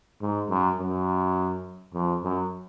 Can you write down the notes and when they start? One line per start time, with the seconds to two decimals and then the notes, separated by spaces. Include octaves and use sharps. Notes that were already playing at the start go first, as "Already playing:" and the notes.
0.21 G#2
0.50 F#2
0.79 F#2
1.94 F2
2.24 F#2